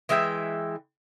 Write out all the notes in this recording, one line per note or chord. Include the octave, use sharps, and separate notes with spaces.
E3 G#3 E5 G5